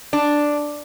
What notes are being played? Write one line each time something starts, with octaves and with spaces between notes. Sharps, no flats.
D4